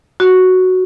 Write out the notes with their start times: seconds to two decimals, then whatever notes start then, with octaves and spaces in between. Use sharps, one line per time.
0.20 F#4